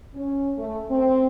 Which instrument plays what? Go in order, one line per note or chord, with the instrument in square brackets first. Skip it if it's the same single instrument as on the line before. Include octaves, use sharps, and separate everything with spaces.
[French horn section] C#4
A3
C4